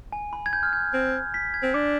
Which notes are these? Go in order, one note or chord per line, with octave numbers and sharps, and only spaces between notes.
G#5
B5
G#6
G6
F6
G6
C4
B6
G#6
C4
D4 D6